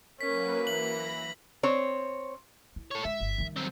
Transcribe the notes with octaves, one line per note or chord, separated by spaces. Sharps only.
F#3 A#3 C#4 A#4 B4 B6
E3 B5 A#6 F#7
C4 C#5
E4
A4 C#5
G#3 E5
G1
D#3 G3
F#3 C4